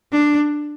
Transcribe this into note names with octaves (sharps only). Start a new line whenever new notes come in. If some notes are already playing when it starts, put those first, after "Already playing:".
D4